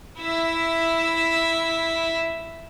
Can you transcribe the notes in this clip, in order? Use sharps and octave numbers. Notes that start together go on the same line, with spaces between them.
E4 E5